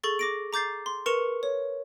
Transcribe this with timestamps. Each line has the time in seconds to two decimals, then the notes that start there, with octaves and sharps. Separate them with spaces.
0.04 G#4 A4 C#6 A6
0.19 D6 A#6 D7
0.53 A#5 D6 G6 A6 C7
0.86 C6
1.06 A#4 B4 C#6 C#7 E7 F7
1.43 C#5